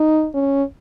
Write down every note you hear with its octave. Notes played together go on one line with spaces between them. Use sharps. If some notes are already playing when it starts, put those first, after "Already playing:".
Already playing: D#4
C#4